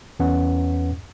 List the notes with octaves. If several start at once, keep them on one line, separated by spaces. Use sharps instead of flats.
E2 C#4 B4 F#5